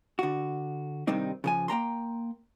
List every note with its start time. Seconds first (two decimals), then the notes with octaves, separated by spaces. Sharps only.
0.19 D3 F#4
1.07 G2 C3 D#3 G3 C4 D#4
1.44 C#3 F3 G#5
1.68 A#3 G5 A#5 C6